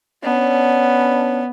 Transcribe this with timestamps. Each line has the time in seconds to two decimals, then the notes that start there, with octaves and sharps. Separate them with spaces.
0.23 B3 C#4 D4